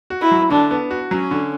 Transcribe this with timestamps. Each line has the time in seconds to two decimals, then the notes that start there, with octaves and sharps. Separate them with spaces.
0.10 F#4
0.21 E4
0.31 F#3
0.50 D3 D4
0.71 B3
0.91 F#4
1.11 F#3 C#4
1.31 D3